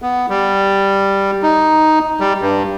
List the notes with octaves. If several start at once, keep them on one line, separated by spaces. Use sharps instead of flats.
B3
G3
D#4
G3
G2